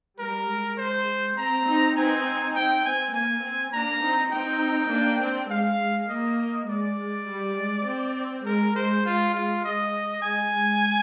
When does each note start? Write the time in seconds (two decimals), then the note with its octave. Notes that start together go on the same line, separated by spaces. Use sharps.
0.19 G3 A#4
0.49 G#3
0.78 C5
1.38 C4 A#5
1.67 C4 D#4
1.97 C4 D#4 G#5
2.55 C4 G5
2.85 C4 G#5
3.14 A#3 G#5
3.44 C4
3.73 A#3 D4 A#5
4.03 C4 D#4
4.32 C4 D#4 G5
4.92 A#3 D4
5.21 C4
5.50 G#3 F5
5.80 G#3
6.10 A#3 D#5
6.69 G#3 D5
6.99 G#3
7.28 G3
7.58 G#3
7.86 C4
8.45 G#3 A#4
8.75 G#3 C5
9.05 G#3 F4
9.34 G#3 F4
9.64 G#3 D#5
10.22 G#3 G#5
10.53 G#3